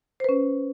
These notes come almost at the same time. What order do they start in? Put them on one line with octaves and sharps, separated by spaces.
C5 B4 C#4